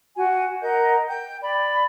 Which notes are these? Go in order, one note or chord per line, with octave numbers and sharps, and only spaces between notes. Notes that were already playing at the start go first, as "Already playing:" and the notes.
F#4 G#5
A#4 D#5 F#5 G6
G5 G6
D5 B5